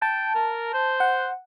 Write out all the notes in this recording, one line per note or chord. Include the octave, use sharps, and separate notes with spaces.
G5 A5
A#4
C5
F#5